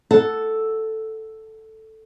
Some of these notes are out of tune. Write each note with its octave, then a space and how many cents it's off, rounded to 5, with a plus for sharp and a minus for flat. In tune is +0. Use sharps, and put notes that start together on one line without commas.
A4 +0 F#5 +0